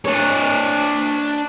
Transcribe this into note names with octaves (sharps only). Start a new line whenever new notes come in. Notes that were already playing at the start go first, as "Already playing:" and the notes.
D4 C#5